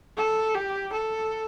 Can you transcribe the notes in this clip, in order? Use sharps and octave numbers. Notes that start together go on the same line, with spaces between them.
A4
G4
A4